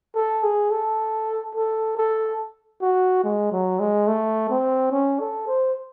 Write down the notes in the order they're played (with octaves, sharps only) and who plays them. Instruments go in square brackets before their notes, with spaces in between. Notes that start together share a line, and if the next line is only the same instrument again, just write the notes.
[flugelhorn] A4
G#4
A4
A4
A4
F#4
G#3
F#3
G#3
A3
C4
C#4
A4
C5